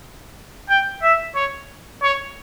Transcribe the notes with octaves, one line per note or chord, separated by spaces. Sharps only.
G5
E5
C#5
C#5